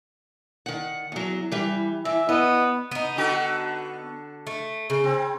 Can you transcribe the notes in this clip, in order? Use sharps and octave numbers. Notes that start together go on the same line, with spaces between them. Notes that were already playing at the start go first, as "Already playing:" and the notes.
D#3 F#5
E2 F#3
E3 G3
E3 E5
B3 D#5
B3 D#4
D3 F#4 A4
A3
C#3
C4